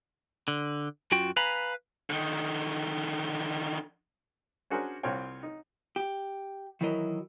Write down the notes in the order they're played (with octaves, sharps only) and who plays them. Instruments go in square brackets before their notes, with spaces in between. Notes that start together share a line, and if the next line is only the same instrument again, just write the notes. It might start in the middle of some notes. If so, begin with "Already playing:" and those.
[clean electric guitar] D3
F#2 F4 F#4 G5
B4 F5 G#5 A#5 B5
[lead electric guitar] D3 D#3
[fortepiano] C#4 D4 F#4 G#4 A#4 C5
C2 C4 F4 C#5 G5
D#4
[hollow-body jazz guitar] G4
D#3 E3 F#3 E4 A#4 D#5